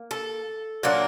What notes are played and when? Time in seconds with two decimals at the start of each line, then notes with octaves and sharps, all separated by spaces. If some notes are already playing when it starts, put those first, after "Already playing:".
Already playing: A#3
0.11 A4
0.83 A#2 F#3 A#3 D4